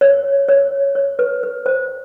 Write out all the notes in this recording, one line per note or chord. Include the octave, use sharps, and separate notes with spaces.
C#5
C#5
C#5
B4
B4
C5